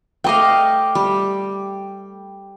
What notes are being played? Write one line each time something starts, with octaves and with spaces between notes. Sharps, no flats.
A3 D#5 F5 G5 D6
G3